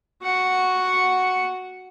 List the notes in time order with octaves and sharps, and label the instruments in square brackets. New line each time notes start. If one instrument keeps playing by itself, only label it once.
[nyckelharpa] F#4 F#5